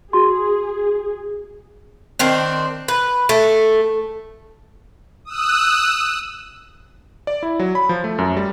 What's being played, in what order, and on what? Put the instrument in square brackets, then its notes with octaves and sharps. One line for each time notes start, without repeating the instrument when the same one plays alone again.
[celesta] F#4 C6 [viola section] G#4
[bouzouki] D#3 C4 D4
B4
A3
[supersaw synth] D#6 E6 F#6
[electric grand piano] D5
E4
F#3
B5
F3
A3
F#2
G3